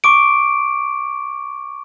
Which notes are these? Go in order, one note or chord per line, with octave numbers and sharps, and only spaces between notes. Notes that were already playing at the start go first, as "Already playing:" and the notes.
C#6 D6 D7